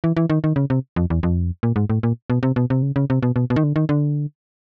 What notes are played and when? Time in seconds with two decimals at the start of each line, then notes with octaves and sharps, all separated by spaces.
0.04 E3
0.17 E3
0.30 D#3
0.44 D#3
0.56 C#3
0.70 C3
0.96 F2
1.10 E2
1.23 F2
1.63 A#2
1.76 G#2
1.90 A2
2.03 A#2
2.30 B2
2.43 C3
2.56 B2
2.70 C3
2.82 C#3
2.96 C#3
3.10 C3
3.23 B2
3.36 B2
3.50 B2
3.56 D#3
3.64 D3
3.76 D#3
3.89 D3